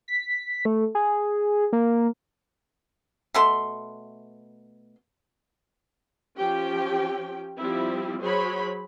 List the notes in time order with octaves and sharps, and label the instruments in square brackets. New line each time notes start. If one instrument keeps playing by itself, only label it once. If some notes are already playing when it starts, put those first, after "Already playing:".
[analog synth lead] B6
A3
G#4
A#3
[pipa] B2 A3 C6
[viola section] F3 C#4 G4 G5
F3 G3 C4 E4
F#3 G#4 C5 C#5 B5